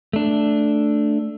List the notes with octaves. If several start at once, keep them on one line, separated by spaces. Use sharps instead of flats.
A3 D4